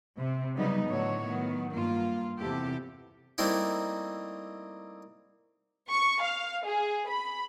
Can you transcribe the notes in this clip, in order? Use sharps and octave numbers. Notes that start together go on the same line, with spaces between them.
C3
C#3 F#3 G3 B3 D#4
A2 D3 F#3 A3 F#4 C#5
D#3 F#3 B3
G2 A#3 F4
E2 C3 G4 A4
G3 A3 A#3 C4 D#4 E4
C#6
F5
G#4
B5